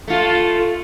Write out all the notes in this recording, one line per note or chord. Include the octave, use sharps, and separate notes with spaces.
A3 F4